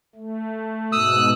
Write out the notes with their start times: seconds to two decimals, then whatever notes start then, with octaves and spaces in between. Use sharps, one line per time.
0.15 A3
0.92 G#2 B2 D#6 E6 F#6